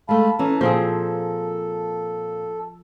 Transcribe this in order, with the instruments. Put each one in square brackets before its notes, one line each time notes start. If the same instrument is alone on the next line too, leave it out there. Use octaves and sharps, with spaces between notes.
[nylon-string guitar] G#3 A3 [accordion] F5 A5 B5
[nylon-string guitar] E3 C#4 [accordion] A4 A#5
[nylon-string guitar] A#2 [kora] F3 C4 G#4 [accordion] A4